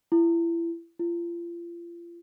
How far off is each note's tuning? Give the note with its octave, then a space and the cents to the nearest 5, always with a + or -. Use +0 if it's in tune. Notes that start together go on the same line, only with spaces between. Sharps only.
E4 +30
F4 -35